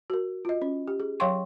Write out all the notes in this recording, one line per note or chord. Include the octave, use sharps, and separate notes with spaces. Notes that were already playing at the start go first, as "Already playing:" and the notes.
F#4 A#4
F4 D#5
C#4
G4
G#4
F#3 C#5 F5 G5 C6 C#6